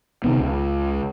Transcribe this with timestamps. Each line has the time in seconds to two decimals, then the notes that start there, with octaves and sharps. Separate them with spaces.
0.24 C3 D#3 B3
0.40 C#2